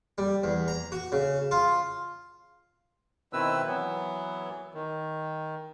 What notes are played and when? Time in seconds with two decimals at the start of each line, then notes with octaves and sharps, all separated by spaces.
0.18 G3
0.44 E2
0.68 A#5
0.92 F#4
1.12 C#3
1.51 F4
3.33 B2 D#3 C4 E4 B4 E6
3.67 E3 F#3 B3
4.74 D#3